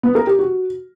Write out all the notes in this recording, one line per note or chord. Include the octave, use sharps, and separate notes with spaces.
B3
A#4
G4
F#4